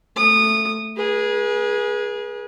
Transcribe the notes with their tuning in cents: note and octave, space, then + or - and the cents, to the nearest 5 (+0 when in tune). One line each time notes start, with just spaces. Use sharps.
A3 +0 D#6 -20
G#4 +0 B4 -40